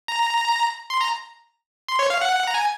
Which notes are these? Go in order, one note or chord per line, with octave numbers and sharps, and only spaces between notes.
A#5
C6
A#5
C6
C#5
F5
F#5
A#5
G#5